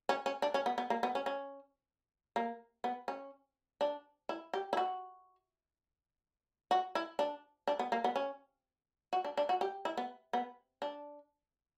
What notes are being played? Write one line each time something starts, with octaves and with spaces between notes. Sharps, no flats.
C#4
C#4
D4
C#4
B3
B3
A#3
B3
C#4
C#4
A#3
B3
C#4
D4
E4
G4
E4
F#4
F#4
E4
D4
D4
B3
A#3
B3
C#4
F#4
D4
D4
F#4
G4
E4
B3
B3
D4